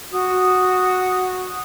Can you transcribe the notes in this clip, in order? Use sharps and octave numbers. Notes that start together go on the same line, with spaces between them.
F#4 D#6